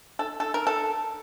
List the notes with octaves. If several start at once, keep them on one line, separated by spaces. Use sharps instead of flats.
A4
A4
A#4
A4